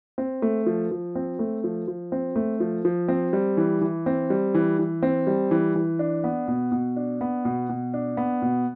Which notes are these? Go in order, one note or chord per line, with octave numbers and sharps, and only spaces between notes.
C4
A3
F3
F3
C4
A3
F3
F3
C4
A3
F3
F3
C4
G3
E3
E3
C4
G3
E3
E3
C4
G3
E3
E3
D4
B3
B2
B2
D4
B3
B2
B2
D4
B3
B2